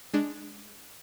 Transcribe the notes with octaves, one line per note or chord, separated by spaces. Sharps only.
G#3 D4